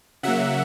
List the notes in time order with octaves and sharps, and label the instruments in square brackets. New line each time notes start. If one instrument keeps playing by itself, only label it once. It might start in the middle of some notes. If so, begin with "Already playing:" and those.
[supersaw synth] C#3 F#3 A#3 E5 F#5